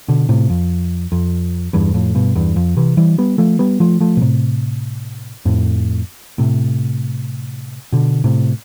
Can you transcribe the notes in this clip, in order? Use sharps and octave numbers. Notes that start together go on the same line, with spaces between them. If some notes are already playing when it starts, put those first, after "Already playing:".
B2 D3
A2 C3
F2
F2
E2 G2
F2 A2
G2 B2
E2 G2
F2
C3 E3
E3 G3
G3 B3
F3 A3
G3 B3
F3 A3
F3 A3
B2
A2 C3
F2 A2
A2 C3
B2 D3
A2 C3